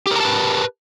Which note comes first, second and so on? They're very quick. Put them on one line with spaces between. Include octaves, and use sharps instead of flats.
G4 A#4 A#5 A5 B4